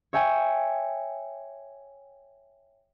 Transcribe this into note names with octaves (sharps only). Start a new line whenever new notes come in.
C#5 E5 G5 G#5